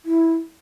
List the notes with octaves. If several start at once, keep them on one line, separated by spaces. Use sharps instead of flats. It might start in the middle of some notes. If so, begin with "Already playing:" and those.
E4